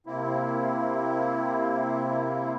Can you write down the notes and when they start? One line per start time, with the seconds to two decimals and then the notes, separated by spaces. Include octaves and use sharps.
0.06 C3 A#3 C4 E4